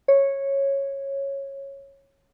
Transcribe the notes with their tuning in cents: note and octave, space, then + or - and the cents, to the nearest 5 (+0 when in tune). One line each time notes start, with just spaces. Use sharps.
C#5 -10